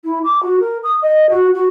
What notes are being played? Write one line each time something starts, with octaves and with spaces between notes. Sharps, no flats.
E4
D6
F#4
A#4
D#6
D#5
F#4
F#4